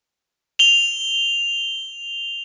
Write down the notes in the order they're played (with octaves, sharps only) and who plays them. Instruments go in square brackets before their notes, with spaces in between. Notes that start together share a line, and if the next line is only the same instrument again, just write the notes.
[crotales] F7 G7